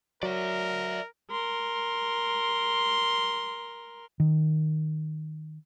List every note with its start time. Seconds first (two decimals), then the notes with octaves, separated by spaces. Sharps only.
0.23 F#3 A#4 D5 E5
1.31 A#4 C6
4.20 D#3